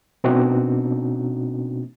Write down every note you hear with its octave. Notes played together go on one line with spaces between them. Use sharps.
B2 A#3 C4 D4 D#4 F#4